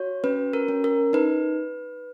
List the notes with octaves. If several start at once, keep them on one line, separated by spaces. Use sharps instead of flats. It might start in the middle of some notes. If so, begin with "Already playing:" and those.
Already playing: F#4 C#5
C#4 B4
A#4
C#4
A#4
D#4 B4